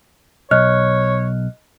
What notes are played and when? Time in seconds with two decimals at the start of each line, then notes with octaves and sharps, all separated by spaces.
0.51 B1 C#5 D#5 F6 F#6